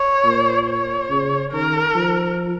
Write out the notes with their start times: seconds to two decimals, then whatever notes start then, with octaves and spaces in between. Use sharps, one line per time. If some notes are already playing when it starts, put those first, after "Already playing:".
Already playing: C#5
0.24 A#2
0.67 C#5
1.10 C#3
1.53 D#3 A#4
1.95 F3